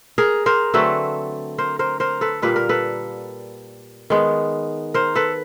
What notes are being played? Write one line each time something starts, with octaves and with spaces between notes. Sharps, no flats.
G#4 A#4
A#4 C5
D3 F#3 A3 C4 A4 B4
A#4 C5
A#4 C5
A#4 C5
A4 B4
A#2 G3 A#3 B4
A#4
A4 B4
D#3 G#3 B3
A#4 C5
A4 B4